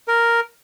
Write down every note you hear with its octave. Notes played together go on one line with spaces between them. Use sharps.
A#4